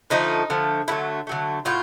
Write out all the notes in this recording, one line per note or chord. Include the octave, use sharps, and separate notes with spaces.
D3 F3 A3 D#4
D3 F3 A3
D3 F#3 A3 E4
D3 F#3 A3
A2 F#3 A3 F4